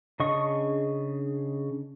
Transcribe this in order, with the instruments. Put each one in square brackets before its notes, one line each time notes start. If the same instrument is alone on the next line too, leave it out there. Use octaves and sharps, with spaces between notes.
[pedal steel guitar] C#3 D4 G#4 D#5 C#6